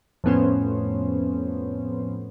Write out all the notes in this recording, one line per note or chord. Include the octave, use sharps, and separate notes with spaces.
F2 A2 B3 C#4 C5